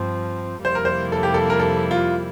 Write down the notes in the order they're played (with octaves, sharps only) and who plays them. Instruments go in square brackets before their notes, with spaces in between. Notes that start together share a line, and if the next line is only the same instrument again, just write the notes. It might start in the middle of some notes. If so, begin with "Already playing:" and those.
Already playing: [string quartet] G2 F3 C4
[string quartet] F2 C3 G3 A#3 E4 [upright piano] C5
[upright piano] A#4
C5
A4
G4
A4
A#4
A4
F4